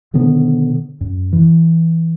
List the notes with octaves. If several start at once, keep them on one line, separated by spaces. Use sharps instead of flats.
B2 D3 D#3 B3
F#2
E3